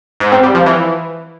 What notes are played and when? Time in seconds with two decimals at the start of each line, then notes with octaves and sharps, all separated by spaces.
0.20 G#2
0.32 C4
0.43 G3
0.55 F3
0.66 E3